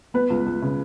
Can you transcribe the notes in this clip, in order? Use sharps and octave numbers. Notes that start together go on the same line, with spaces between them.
B3 B4
C#2
C#2
C#3